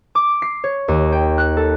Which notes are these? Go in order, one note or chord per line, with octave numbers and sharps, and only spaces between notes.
D6
C7
C#5
D#2
G5
F#6
A4